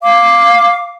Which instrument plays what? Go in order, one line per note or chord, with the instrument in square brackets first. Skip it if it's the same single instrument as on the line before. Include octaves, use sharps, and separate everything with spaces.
[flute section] F5 D6